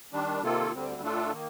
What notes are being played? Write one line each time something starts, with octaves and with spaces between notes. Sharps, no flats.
D#3 G3 D4
C3 D#3 A#3 F4 A4
D2 D3 G3 C4
A2 A3 D4 F4 A4
D#3 A#3